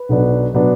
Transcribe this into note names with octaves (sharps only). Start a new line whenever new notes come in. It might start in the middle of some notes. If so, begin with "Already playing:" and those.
Already playing: B4
B1 B2 F#3 B3 D4
B2 F#3 B3 D4